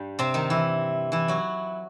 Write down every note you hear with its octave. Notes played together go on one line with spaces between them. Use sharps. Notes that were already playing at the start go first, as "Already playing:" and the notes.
Already playing: G2 G3
C3 C4
D#3 D#4
E3 E4
E3 E4
F#3 F#4